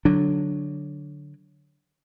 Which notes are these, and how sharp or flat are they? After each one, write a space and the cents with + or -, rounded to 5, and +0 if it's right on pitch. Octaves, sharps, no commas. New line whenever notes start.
D3 +0 F#3 +0 D4 +0